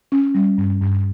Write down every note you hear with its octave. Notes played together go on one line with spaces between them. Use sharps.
C#4
G3
G2
G2